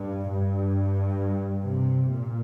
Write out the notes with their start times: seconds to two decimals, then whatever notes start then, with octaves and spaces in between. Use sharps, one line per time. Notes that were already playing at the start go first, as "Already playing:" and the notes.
Already playing: G2
0.30 G2
1.65 C3
2.10 A#2